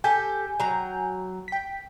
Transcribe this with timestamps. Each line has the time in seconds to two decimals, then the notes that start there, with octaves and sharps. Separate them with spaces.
0.04 G4 A4 G5 G#5 G6
0.60 F#3 A#5
1.48 G5 B6